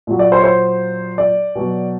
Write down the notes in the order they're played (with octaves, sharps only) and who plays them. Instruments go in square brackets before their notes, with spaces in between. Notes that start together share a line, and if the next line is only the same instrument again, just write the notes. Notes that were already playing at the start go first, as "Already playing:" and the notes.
[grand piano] A#2 F#3
D5
C5
C#5
C5
D5
B2 F#3